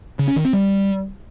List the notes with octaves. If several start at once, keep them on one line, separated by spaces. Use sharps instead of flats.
C#3
C#4
D#3
C4
G3